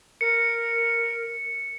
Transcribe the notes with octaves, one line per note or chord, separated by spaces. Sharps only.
A#4 C#7